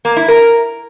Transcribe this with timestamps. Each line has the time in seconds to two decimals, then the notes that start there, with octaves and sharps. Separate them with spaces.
0.05 A#3
0.17 E4
0.28 A#4